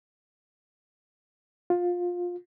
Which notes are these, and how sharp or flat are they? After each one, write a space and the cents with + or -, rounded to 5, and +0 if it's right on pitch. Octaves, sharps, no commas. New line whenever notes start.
F4 +20